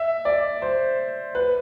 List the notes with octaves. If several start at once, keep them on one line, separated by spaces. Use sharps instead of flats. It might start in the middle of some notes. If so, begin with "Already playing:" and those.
Already playing: E5
D5
C5
B4